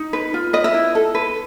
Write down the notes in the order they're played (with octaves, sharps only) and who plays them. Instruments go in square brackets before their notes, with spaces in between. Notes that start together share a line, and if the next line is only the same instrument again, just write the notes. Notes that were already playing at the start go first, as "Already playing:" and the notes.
Already playing: [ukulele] D#4
B4
F4
B4 D#5
E5
E4
A4
B4